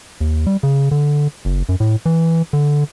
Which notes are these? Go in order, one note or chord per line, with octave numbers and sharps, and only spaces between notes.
D#2
G3
C#3
D3
F#1
F#2
A2
E3
D3